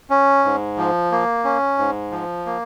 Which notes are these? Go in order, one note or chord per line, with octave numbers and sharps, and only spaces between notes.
C#4
G#2
F3
A#3
C#4
G#2
F3
A#3